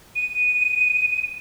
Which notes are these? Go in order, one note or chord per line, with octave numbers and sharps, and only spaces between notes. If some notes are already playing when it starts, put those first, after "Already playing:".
D#7